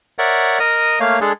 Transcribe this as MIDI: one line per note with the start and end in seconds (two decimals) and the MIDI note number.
0.19 0.59 70
0.19 0.59 73
0.19 0.59 74
0.19 0.59 76
0.19 0.59 78
0.60 0.99 70
0.60 0.99 75
0.60 0.99 87
0.60 0.99 89
1.00 1.19 57
1.00 1.19 58
1.00 1.19 73
1.00 1.19 77
1.00 1.19 89
1.21 1.32 56
1.21 1.32 62
1.21 1.32 68
1.21 1.32 69